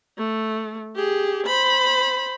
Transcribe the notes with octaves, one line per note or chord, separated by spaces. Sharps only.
A3
G4 G#4
C5 B5